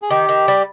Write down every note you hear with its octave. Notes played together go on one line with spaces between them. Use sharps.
G#4
D#3 G4
D#3
G3